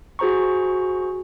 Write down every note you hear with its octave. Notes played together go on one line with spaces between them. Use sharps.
F#4 G#4 C5 A#5 C#6